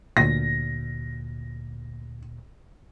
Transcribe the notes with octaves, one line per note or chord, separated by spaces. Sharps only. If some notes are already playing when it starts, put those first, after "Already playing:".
D2 A#2 A#6